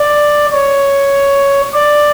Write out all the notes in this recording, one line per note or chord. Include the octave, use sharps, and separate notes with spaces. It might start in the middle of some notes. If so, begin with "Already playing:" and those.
Already playing: D5
C#5
D5